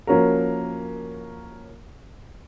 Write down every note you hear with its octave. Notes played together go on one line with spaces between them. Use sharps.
F3 A#3 C#4 F#4 A#4